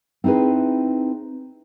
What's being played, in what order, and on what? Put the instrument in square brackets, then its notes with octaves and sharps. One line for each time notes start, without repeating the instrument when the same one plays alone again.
[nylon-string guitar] C4 D#4 E4 G#4 B4